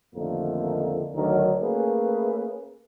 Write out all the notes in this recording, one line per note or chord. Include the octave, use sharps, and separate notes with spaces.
A1 F2 D3 D#3 A3 A#3
D2 D#3 F#3 D4 A#4
A3 A#3 C#4 G#4 B4